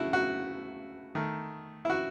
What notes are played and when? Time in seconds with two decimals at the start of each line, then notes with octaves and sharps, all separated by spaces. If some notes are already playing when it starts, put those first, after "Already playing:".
Already playing: C#3 A3 E4 F#4
0.13 F#4
1.15 D#3 A3
1.85 E4
1.90 F#4